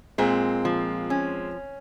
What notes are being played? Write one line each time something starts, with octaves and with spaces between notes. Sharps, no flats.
A#2 G#3 C4
F3
C#4